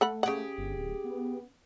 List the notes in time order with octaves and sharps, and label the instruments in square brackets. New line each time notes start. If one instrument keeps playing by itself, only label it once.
[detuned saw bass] A3 [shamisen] A4 F#5 B5
[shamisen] C#3 F#5 [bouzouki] G4 G#4
[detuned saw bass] G1
D1
B3